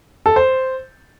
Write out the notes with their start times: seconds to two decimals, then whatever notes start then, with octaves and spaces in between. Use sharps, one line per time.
0.26 A4
0.36 C5